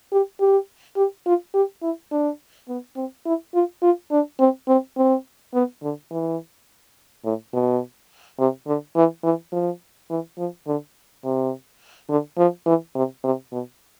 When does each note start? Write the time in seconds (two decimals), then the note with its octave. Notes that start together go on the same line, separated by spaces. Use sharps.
0.12 G4
0.40 G4
0.97 G4
1.26 F4
1.54 G4
1.82 E4
2.12 D4
2.69 B3
2.96 C4
3.26 E4
3.54 F4
3.82 F4
4.11 D4
4.40 C4
4.68 C4
4.97 C4
5.54 B3
5.83 D3
6.11 E3
7.25 A2
7.53 B2
8.39 C3
8.67 D3
8.96 E3
9.24 E3
9.52 F3
10.10 E3
10.38 F3
10.67 D3
11.25 C3
12.09 D3
12.38 F3
12.66 E3
12.95 C3
13.24 C3
13.52 B2